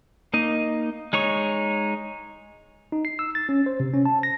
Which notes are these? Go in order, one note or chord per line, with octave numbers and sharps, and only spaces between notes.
A#3 D#4 D#5
G#3 D#4 C#5 C#6
D#4
C7
E6
A6
C#4
C5
C3
C#4
A5
A#6